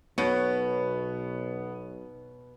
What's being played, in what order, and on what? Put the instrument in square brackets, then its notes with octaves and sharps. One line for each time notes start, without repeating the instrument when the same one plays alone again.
[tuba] B1 [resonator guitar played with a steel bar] B2 [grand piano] B3 [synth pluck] C#5